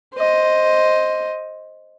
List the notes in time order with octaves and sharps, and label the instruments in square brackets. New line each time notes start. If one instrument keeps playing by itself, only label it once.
[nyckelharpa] C5 D#5